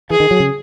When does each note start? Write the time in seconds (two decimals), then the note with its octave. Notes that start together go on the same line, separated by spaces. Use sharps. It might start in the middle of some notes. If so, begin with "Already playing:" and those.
0.10 E3 G#4
0.20 D#3
0.31 F#3
0.40 C#3